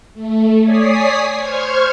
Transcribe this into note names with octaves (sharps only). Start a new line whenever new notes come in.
A3
C#5 D5 G#5 D#6 B6 C7
C5 C#6 F6 G#6